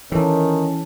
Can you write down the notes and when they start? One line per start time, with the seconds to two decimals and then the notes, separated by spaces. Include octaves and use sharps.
0.12 D#3 E3 C#4 A4 C#5 A5